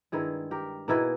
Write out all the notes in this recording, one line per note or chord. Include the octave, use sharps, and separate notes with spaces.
G2 D#3 G#3 E4 G#4
G4 A#4
B2 A#3 D#4 E4 G#4